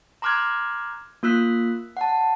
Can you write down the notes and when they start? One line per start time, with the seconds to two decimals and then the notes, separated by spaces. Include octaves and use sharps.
0.22 A#5 C6 D6 F6 F#6 G#6
1.23 A#3 F4 E6 F#6 B6
1.97 F#5 A5